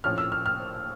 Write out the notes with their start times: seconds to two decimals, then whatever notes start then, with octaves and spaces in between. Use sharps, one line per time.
0.04 A#1 A2 F3 C#4 F6
0.18 E6
0.32 F6
0.46 F6